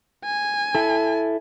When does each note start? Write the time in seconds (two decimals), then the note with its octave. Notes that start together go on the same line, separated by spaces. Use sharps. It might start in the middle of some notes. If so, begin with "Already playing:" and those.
0.25 G#5
0.75 E4 A4